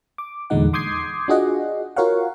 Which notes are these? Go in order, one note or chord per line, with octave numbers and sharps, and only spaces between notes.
D6
E2 A#2 D3 G#3 D#4 F#5
C6 D6 D#6 G6 G#6 C7
D4 F4 F#4 G#4 D#5 F#5
F4 F#4 A#4 C#5 F5 F#5